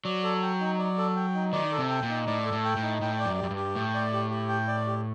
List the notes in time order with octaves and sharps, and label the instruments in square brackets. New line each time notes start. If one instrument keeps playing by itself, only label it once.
[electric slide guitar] F#3 [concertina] D5
[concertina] A4
G5
D#4
D5
A4
G5
D#4
[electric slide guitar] D#3 [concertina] D5
[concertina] A4
[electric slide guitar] C3
[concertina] G5
[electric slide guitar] A#2
[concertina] D#4
[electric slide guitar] A2 [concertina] D5
[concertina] A4
[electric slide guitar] A2
[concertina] G5
[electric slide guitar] A2
[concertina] D#4
[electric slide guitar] A2 [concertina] G5
[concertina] D5
[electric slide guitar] F#2
[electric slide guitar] F#2 [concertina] G4
[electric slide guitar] G2
[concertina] G4
[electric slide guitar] A2 [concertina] G5
[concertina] D5
G4
G4
G5
D5
G4